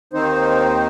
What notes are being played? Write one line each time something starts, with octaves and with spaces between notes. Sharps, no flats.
D#2 D#3 C4 D#4 C5